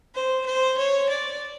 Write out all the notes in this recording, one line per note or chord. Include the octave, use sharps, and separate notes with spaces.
C5
C5
C#5
D5